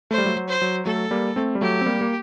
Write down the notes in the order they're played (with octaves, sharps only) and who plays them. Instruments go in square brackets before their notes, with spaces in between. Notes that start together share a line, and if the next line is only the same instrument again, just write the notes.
[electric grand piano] A3 [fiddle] C5
[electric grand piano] G3
F#3 A3
F#3
[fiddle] C5
[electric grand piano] F#3
[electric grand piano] F#3 A3 [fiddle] A4
[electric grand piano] G3 A#3
A3 C4
G3
[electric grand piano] F#3 A3 [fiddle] G4
[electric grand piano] C4
G3 A#3
A#3